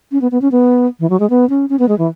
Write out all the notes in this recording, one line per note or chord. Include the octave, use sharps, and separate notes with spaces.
C#4
B3
B3
C#4
B3
E3
F#3
G#3
B3
C#4
C#4
B3
G#3
E3